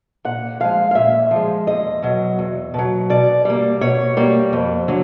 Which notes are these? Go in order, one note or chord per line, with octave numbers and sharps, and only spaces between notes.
A#2 F#5
F3 G#3 F5
F5
A#2 E5
F3
G#3
E2 D#5
B2 F#3
E2
B2 F#3
B2 D5
G3 A#3
B2 C#5
G3 A#3
F2
D3 F#3